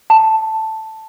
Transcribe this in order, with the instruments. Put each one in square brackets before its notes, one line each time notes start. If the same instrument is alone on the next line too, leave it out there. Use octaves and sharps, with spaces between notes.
[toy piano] A5